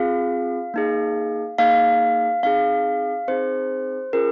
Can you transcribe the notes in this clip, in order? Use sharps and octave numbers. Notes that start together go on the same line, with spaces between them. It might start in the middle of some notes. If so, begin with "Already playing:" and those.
Already playing: C4 F4 G#4 F5
A#3 D#4 G#4
A#3 D#4 G#4 F5
C4 D#4 G#4 F5
C4 D#4 G#4 C5
C#4 F4 G#4 A#4